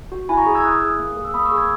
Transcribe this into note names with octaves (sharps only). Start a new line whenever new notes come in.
F#4
E4 G#5 B5
A#5 C#6
G#4
E6 G#6
E4 D#6 F#6
G#4
A#3
G#4
E6
A#3 B5 D#6
C#6 E6
G#4
E6 G#6